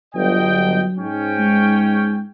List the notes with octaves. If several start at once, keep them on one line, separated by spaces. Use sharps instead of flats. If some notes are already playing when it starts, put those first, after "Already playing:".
G1 F#3 D#5 G5
G#2 C#4 G5
G#3